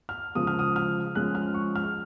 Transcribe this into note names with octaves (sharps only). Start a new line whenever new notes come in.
F6
C#3 F3 G#3 D#6
F6
D#6
F6
F3 G#3 C#4 F#6
F6
C#6
F6